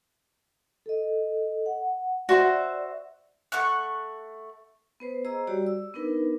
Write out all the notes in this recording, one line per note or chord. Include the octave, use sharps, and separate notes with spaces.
A4 D#5
F#5
F#4 C5 D5 E5
A3 F#5 C#6 F#6
B3 B4 C5
G#4 C5 D#5 A#5 E6
G3 F#4 G4 C#5 D5
E6
B3 D4 D#4 A#4 B4